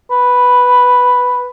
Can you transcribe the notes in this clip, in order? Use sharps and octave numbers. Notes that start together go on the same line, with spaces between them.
B4